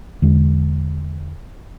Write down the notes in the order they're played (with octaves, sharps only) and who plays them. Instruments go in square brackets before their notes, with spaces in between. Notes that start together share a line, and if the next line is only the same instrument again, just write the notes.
[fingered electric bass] E2 D3 G#3